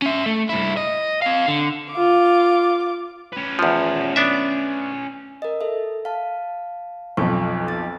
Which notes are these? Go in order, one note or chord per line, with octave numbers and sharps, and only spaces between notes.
C#4 E5
A3
G2 E4
D#5
C4 F5
D3
F4 D6
C#4 B4
E2 F3
B3 D4 E5
A#4 D#5
A4 E5
F5 A5
B1 F2 C#6
C4 A6